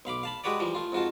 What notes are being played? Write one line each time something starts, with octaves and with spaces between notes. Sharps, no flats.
B1 F5 B5 D6
F5 A5 B5
G#3 F#4 G4 B4 C#5 D5
E3 F3 G3
A3 F4
F2 G#2 F4 F#4 A5